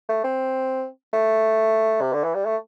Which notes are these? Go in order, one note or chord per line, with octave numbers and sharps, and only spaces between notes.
A3
C4
A3
C3
D3
E3
G3
A3